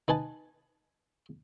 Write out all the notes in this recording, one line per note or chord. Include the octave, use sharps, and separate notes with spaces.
D#4 B4 G#5 A5